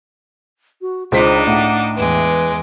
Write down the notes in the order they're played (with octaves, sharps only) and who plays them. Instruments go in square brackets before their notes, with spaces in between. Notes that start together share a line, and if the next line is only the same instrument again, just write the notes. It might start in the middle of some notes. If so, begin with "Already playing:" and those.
[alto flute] F#4
[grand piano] C#2 C5 B6 [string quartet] D4 D#4 D6 [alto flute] G#4
[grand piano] A2 [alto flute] F#5
[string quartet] E2 G#3 D6 [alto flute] B4